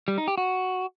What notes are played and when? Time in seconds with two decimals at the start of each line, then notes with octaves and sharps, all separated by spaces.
0.08 G3
0.18 D#4
0.28 G4
0.38 F#4